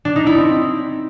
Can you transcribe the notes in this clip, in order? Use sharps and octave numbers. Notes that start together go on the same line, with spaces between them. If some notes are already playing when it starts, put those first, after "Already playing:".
D4
D#4
E4
C4